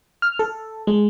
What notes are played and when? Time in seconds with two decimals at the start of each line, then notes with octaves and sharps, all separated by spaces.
0.22 F6
0.39 A4
0.87 G#3